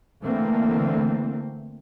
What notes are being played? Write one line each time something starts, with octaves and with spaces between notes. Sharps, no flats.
D3 E3 A3 A#3 C4